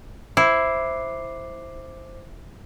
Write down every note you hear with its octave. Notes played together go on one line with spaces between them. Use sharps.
E4 C5 D6 C7